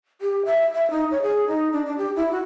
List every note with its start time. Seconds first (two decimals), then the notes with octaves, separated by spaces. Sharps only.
0.21 G4
0.45 E5
0.74 E5
0.90 D#4
1.11 C#5
1.22 G#4
1.47 D#4
1.72 D4
1.86 D4
1.98 G4
2.16 E4
2.31 F#4